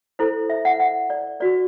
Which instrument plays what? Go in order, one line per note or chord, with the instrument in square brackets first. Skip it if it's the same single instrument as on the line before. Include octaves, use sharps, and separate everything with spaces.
[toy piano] E4 A4 C5
E5
F#5
F#5
D5
F#4 B4 D5